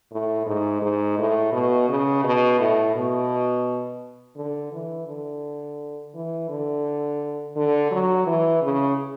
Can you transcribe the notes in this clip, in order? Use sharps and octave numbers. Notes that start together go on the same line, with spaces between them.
A2
G#2
G#2
A2
B2
C#3
B2
A2
B2
D3
E3
D3
E3
D3
D3
F#3
E3
C#3